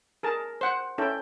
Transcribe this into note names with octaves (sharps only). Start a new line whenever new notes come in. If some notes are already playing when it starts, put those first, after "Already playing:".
G#4 A#4 A5
C5 F#5
C#4 E4 A4 G5